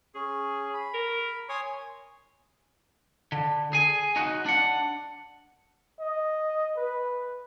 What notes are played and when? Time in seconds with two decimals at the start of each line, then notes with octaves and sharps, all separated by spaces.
0.15 C#4 G#4
0.74 B5
0.94 A#4
1.49 C#5 G#5 C6 D#6
3.32 D3
3.73 G#4 G#5
4.16 D#4 F#4
4.46 D4 F#5
6.00 D#5
6.77 B4